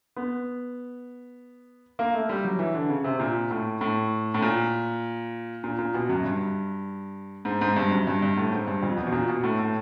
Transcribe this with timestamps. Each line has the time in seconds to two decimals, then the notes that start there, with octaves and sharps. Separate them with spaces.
0.16 B3
1.99 A#3
2.14 A3
2.29 G3
2.44 F#3
2.59 E3
2.74 D3
2.89 C#3
3.04 C3
3.20 A#2
3.51 A2
3.81 A2
4.34 A2
4.42 A#2
5.64 A#2
5.79 A#2
5.94 B2
6.09 F#2
6.24 G2
7.45 G#2
7.61 G#2
7.72 G#2
7.76 G2
7.92 F#2
8.07 G2
8.22 G2
8.37 A2
8.52 G#2
8.67 G2
8.83 F2
8.97 E2
9.07 B2
9.12 A#2
9.28 B2
9.43 A2
9.59 A2